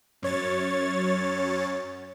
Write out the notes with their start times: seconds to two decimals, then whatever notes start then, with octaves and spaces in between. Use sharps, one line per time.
0.22 F#2 C#5 A6